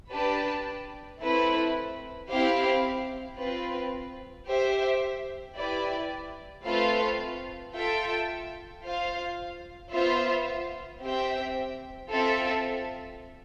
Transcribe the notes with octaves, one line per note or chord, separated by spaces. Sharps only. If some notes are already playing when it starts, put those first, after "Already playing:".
D4 G4 B4 D5 A5
A3 C4 E4 B4
C4 E4 G4 C5 F5
C4 F4 B4
G4 C5 E5
E4 G4 B4 D5
A3 C4 F4 B4 F5
F4 A4 E5 G5
F4 C5 F5
B3 F4 C5 E5
C4 G4 C5 E5 G5
C4 F4 A4 E5